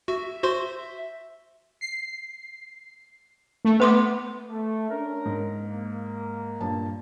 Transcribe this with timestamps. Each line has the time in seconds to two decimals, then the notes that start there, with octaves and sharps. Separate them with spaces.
0.08 F#4 E5
0.43 F#4 C5 C6
1.81 C7
3.65 A3
3.80 A3 B3 C6 D6
4.49 A3
4.89 C#4 D4 A#4
5.25 G#2
5.64 A#3
6.60 G2 A#2 A5